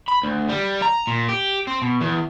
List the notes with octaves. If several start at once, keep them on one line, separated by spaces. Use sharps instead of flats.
B5
D2
G3
A#5
A#2
G4
C4
B2
E2